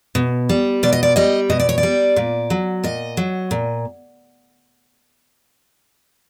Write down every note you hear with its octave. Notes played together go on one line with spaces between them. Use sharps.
B2
G3
B2 D5
D#5
D5
G3 D#5
B2 D#5
D5
C#5
D5
G3
A#2
F#3
A#2 D#5
F#3
A#2